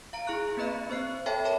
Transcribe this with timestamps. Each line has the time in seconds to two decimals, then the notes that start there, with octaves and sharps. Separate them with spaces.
0.13 F5 A#5 D7
0.27 E4 G#4 A#5 C#6 F#6
0.57 A#3 C4 B4 D#5 B5
0.90 C4 C5 F#6 C7
1.26 A4 C#5 E5 G5 A5 B5
1.45 A#4 A5 B5